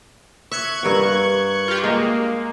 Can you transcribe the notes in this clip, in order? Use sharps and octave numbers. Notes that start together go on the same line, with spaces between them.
E5 C#6 F#6 G#6
G2 A#4 F#5
F4 G4
G#3 A#3